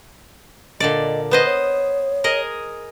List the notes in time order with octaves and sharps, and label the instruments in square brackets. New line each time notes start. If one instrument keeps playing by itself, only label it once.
[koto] A#2 D3 D5 [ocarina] D#5
[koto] B3 C5 D#5 [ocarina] B4
[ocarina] C#5
[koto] G#4 A#4 D#5